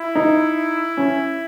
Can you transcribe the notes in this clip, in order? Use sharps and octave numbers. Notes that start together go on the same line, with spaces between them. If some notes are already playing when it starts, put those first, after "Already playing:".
Already playing: E4
D#4
C#4